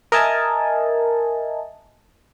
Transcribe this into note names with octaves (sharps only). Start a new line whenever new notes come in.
A#4 D#5 E5 G#5 A5